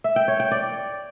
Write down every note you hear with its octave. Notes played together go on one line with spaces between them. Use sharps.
E5
G5
C#5
G5
D5